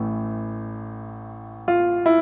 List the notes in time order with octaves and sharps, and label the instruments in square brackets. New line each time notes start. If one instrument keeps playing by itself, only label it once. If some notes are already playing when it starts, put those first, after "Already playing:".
Already playing: [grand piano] A1 A2 E3 A3
F4
E4